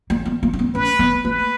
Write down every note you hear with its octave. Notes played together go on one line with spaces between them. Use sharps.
A#3
B3
A#3
C#4
B3
C#4 B4
B3
A#3 B4